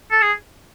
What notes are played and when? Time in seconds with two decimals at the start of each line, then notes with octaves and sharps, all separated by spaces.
0.11 A4
0.22 G#4